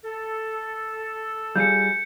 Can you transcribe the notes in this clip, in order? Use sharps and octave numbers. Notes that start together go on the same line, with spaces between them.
A4
G3 F4 G#4 G6 C#7